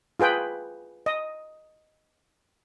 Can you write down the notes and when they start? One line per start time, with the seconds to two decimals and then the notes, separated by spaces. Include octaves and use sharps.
0.20 F4 G#4 B4 G5
1.06 D#5